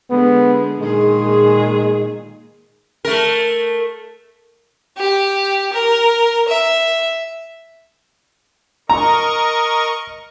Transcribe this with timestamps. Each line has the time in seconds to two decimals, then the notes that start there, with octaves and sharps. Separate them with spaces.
0.10 D3 G#3 B3
0.81 A#2 D#3 G#3 G#4
3.05 A3 A#4
4.97 G4
5.73 A#4
6.48 E5
8.90 A#4 D#5 A#5 C#6